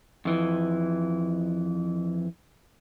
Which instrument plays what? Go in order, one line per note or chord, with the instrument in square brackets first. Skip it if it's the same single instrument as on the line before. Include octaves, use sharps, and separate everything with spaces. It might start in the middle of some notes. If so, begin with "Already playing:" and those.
[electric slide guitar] F2 E3